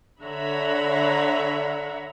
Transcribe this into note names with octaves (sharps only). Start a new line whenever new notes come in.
D3 C#5 E5 F#5 A#5 B5